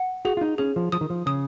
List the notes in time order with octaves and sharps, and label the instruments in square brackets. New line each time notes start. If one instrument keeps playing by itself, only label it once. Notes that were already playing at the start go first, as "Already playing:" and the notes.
Already playing: [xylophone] F#5
[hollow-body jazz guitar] F#4 [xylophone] G#4
[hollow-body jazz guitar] F4
D#4
[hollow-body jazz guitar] C#4 [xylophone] G#4
[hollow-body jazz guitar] F3
[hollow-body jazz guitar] F3 [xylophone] D#6
[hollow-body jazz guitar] D#3
F3
[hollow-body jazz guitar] C#3 [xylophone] D#6